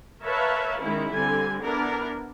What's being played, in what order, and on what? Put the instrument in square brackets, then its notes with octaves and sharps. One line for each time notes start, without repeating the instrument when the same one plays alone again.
[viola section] A#4 B4 C#5 E5 F5 A5
D#3 G#3 C#4 E4
D3 G3 C4 G#5
B3 D4 E4 A#4